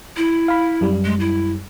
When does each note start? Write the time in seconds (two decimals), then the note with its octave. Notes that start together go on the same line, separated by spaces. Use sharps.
0.17 E4
0.48 F5 B5
0.81 F#2 G3
1.05 G#3
1.20 E4